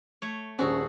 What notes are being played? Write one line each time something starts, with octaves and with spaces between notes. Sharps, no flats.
A3 C#5
D#1 C#4 D4 F#4 G#4 A4 C5